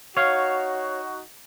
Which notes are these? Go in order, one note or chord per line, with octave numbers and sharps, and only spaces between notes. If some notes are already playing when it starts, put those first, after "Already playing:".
D#4 F#4 C#5 F5